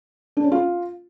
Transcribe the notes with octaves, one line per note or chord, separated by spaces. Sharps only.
D4
C#4
F4